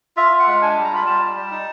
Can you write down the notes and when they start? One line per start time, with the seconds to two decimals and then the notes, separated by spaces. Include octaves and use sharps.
0.17 F4 E5
0.32 F4
0.39 F#5
0.47 G#3
0.62 D4 G#5
0.77 G3
0.84 A#5
0.92 F4 B5
1.07 G3 A5
1.21 G3
1.36 G3
1.51 D#4